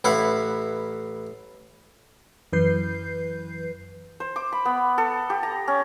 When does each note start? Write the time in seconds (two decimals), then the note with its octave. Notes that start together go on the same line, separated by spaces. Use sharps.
0.04 A1 E4 B4 F5 F#5
2.53 F#2 E3 B4 G6 C7
4.20 C5
4.36 D6
4.52 B5
4.65 B3
4.98 A4
5.30 G4
5.43 A#5
5.68 C#4